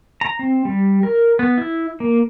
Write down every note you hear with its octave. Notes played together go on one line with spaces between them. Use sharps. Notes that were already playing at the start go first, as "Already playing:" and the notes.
A#5
C4
G3
A#4
B3
E4
A#3